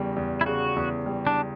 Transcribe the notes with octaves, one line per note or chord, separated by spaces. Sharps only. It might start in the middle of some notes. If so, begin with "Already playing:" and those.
Already playing: E2 C#3 G3
E2
E4
C#3 F#4
E2
G3
D4